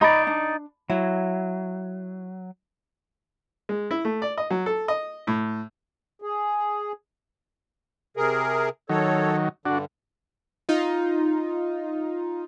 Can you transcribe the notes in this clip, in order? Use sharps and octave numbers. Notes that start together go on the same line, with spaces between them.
D#4 D5 D#5 A#5 B5
D4
F#3 E4
G#3
E4
A3
D5
D#5
F#3
A4
D#5
A2
G#4
C3 G#4 A#4
D#3 F#3 A4 C#5
G2 D3 D4 F#4
D#4 F4